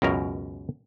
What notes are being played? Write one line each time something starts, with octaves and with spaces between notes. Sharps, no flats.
C#2 F#2 B2 A#4